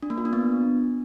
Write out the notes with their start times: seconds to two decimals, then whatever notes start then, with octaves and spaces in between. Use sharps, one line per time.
0.03 D4
0.10 A#3
0.18 F4
0.25 D4
0.33 B3